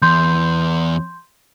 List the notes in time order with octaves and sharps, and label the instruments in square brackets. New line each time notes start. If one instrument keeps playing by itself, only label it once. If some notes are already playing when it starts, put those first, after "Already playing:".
[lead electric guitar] E2 [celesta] C6 G6